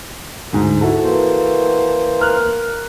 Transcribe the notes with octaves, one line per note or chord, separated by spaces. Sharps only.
D2 G#2
E4 F#4 A4
E3 A#3 C5
A#4 F6 F#6